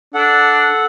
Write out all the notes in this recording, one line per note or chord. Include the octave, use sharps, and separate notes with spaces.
D4 A4 F#5